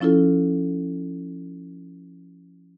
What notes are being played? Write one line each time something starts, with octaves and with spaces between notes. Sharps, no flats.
F3 C#4 E4 F4 A4